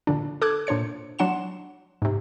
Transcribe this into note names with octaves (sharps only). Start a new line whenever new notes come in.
A#2 D3 D4
A4 D6 F#6 G#6
A#2 D4 C5 C#5 C#7
F#3 D4 F#5 C6 E7
G#2 C3